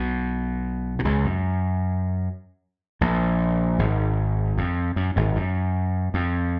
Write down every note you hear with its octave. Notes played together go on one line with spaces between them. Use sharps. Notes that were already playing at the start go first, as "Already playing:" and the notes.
Already playing: B1 B2
B2
C#2 C#3
F#2
A#1 A#2
G#1 G#2
F2
F#2
G#1 G#2
F#2
F2